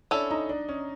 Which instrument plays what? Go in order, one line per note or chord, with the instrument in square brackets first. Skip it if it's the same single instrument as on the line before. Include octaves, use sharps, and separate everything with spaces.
[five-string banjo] C#4 E4 A4 [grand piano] D4
[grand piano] D#4
D4
C#4